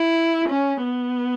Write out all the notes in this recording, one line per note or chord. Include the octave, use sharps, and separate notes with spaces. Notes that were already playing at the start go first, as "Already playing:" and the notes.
Already playing: E4
C#4
B3